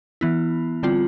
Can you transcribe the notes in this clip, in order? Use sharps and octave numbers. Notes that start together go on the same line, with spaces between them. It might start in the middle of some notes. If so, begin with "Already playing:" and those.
E3 B3 E4
D3 G3 C4 F4